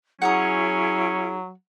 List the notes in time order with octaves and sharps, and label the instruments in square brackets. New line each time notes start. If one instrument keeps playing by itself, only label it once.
[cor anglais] F#3 [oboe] C#4 [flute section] E4 G#4 [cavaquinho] F#5 A#5 D#6